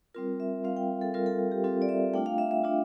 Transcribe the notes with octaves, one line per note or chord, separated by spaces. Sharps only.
G3 C4 F4 A#4
E5
G3 C4 F4 F5
G5
A4
G3 C4 F4 A#4
A4
A4
G4
G3 C4 F4 A4
D5
E5
A3 D4 F4 G5
F5
E5
E5
A3 D4 F4